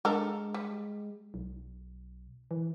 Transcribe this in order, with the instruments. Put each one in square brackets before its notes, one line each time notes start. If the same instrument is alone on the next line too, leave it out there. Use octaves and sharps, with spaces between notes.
[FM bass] G#3 [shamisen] D4 A4 A#4
[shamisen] G3
[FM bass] B1
E3